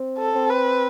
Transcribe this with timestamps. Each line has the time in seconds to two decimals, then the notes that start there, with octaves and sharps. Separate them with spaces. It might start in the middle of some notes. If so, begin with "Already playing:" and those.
Already playing: C4
0.18 A4
0.35 C4
0.50 B4